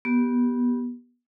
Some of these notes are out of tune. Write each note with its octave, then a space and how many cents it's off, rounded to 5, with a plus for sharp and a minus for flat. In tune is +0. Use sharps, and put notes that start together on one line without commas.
B3 -20 G4 +0